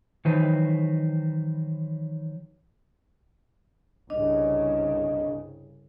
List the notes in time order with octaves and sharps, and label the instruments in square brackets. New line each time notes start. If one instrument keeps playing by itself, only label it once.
[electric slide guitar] D#3 E3 F#3 D#4 B4 C5
[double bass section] C2 G2 C#3 [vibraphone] D4 D#5